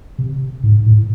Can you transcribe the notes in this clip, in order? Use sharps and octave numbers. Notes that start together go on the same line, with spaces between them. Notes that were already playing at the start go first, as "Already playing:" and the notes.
C3
G#2
A2